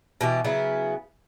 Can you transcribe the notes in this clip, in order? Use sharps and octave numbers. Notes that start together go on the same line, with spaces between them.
B2 E3 G4
C#3 F#3 B3 E4